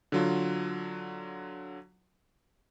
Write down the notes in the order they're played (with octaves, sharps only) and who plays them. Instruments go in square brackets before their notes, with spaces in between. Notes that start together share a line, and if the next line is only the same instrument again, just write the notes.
[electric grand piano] D3 F#3 F4